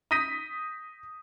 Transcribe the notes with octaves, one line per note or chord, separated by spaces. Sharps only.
D#6 G6 A#6 B6 D#7